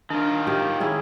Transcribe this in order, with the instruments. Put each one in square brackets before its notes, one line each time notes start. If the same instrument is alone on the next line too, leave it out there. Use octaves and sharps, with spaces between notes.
[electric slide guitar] D#3 F4 [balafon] D4
[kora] A#3 G4 G5
C#4 E4 G#4